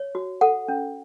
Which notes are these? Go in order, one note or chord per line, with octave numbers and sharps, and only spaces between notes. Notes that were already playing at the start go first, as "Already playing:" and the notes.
Already playing: C#5
F#4
A4 F#5
C#4